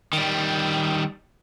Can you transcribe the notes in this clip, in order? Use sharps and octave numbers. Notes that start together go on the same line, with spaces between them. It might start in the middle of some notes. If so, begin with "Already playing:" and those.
D#3 G3